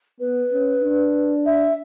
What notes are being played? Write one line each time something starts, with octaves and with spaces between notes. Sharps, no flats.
B3 B4
C#4
D4
E5